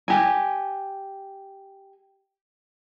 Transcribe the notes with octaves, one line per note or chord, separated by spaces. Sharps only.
G4 G#5